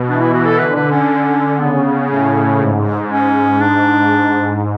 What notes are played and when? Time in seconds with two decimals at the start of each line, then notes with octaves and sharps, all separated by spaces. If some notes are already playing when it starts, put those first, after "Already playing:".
Already playing: B2
0.08 E3 D4
0.21 E4
0.34 F#4
0.46 A4
0.59 D3 B4
0.76 B4
0.92 C#4
1.60 C#3 B3
2.09 A2 C#4
2.60 G#2
3.10 C#4
3.61 D4